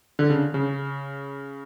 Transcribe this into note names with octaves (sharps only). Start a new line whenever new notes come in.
D3
C#3
C#3